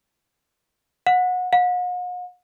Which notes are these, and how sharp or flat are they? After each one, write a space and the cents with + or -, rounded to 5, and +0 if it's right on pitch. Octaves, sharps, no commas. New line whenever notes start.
F#5 -25
F#5 -45